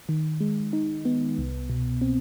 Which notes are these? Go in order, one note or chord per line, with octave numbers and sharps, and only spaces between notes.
D#3
G#3
D#4
B3
C2
B2
C4